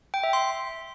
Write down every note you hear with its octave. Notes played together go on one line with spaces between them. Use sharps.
G5
E5
C6